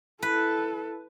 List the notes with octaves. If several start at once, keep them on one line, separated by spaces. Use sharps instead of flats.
E4 A4 B4